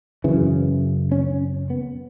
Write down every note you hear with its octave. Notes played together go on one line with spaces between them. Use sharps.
F#2 C#3 E3
C#4
B3